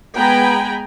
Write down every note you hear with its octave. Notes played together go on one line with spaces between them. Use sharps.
G#3 B3 G5 G#5 A#5 B5